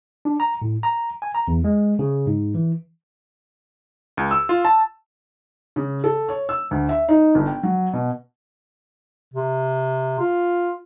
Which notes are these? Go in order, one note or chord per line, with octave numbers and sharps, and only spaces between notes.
D4
A#5
A2
A#5
G#5
A#5
E2
G#3
C#3
G#2
E3
C#2
E6
F4
A5
C#3
A4
C#5
E6
D2
E5
D#4
G1
G5
F#3
B2
C3
F4